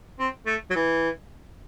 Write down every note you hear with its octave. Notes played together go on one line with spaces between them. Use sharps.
C4
A3
F#3
E3